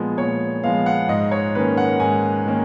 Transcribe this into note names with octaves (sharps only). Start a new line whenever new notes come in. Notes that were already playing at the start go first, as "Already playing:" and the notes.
Already playing: A#2 F3 G#3 B3
A#2 C#5
F3 G#3 B3 F5
F#5
G#2 D#5
C#5
D#3 A#3 C#4 B4
F#5
G#2 G#5
D#3 A#3 C#4